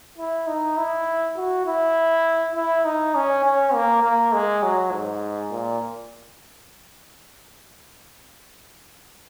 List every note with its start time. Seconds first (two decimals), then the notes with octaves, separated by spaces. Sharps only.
0.18 E4
0.47 D#4
0.77 E4
1.37 F#4
1.66 E4
2.55 E4
2.85 D#4
3.15 C#4
3.44 C#4
3.74 A#3
4.04 A#3
4.33 G#3
4.63 F#3
4.92 G#2
5.52 A#2